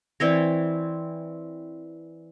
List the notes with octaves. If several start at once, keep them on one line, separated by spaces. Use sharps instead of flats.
E3 C4 C#5 D5 E6 A#6